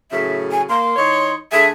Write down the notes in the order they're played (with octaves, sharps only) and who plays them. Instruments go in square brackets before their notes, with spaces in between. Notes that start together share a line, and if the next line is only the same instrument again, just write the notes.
[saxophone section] F#2 A2 C#3 [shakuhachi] E5
[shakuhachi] G#5
[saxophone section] A#3 [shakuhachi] C6
[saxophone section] E3 D#4 C#5
[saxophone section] D3 A3 G#4 [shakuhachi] E5